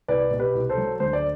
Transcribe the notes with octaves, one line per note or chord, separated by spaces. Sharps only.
C2 B4 D5
B2
G4 B4
C2
A4 C5
F#3
D2 C5
D5